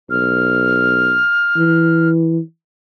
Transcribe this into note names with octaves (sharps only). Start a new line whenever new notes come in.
B1 F6
E3